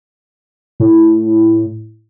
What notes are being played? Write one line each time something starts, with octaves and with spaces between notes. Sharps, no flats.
A2